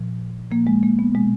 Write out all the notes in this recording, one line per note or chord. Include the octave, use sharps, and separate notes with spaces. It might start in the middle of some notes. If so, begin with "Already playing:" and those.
Already playing: A#2 F3
A#2 F3 A#3
G#3
A#3
B3
B2 G#3